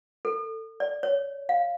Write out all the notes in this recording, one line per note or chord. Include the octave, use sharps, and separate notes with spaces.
A4
D5
C#5
F5